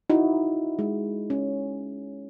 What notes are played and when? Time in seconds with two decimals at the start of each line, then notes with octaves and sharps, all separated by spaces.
0.10 D#4 E4 F#4
0.79 G#3
1.30 C#4